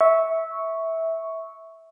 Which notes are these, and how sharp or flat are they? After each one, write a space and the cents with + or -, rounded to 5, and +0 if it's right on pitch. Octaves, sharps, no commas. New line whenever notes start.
E5 -15 C#6 +0